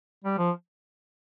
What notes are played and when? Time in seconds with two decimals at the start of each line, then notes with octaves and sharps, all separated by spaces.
0.24 G3
0.38 F3